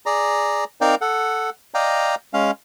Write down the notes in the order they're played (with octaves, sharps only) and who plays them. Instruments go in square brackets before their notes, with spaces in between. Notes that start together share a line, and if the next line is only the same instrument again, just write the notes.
[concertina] G#4 D5 A#5
C4 D#4 A#4 D5 F5 G5
A4 F#5
D5 D#5 F5 G5 A#5
G#3 C#4 F5